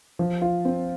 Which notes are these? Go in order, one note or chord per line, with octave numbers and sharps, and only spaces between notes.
F3
F4
C4